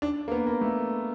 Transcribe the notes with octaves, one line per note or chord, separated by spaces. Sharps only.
D4
A#3
B3
A#3
A3